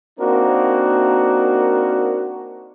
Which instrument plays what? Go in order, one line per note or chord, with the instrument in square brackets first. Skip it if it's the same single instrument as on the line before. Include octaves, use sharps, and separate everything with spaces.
[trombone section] A#3 C4 D4 D#4 F#4 A#4